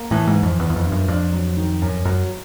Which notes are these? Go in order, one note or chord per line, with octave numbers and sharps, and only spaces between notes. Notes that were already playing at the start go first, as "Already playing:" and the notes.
Already playing: A#3
A2 E3
G#2
E3
F2
E2 B3
E2
F2
G2
F#2
F2 D4
F#3
D#3
F#2
F#2 F#3